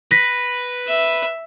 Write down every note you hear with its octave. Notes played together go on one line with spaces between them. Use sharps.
B4 A#6 B6
E5